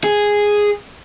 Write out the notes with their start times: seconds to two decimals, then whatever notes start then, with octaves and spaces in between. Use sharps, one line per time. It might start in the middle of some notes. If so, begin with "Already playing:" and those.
0.04 G#4